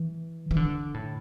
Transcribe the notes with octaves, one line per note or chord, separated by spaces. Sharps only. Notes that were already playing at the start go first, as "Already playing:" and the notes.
Already playing: E3
E3
D3
A2